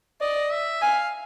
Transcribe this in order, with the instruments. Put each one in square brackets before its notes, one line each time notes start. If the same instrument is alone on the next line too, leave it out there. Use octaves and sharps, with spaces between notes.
[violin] D5 [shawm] D#5
[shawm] E5
[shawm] F5 [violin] G#5